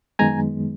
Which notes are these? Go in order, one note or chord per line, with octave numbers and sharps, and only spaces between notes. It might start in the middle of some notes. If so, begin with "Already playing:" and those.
F#2 D#3 G#3 B3 G#5 A#5